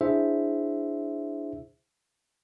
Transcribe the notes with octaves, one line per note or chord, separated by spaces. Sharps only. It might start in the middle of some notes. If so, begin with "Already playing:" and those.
D4 E4 G#4 C5 E5